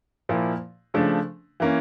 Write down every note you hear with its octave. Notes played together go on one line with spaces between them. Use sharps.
A#2 F3 A#3 E4
C#3 F3 A3 D4
E3 A#3 C#4